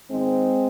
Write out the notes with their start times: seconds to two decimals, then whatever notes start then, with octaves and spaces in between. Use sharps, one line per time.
0.11 G#2 D#3 G#3 C4